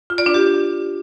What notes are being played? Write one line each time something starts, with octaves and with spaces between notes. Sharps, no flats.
F4
D5
D4
G4